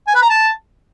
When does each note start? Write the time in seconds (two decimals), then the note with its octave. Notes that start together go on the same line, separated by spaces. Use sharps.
0.07 G#5
0.15 B4
0.22 A#5
0.30 A5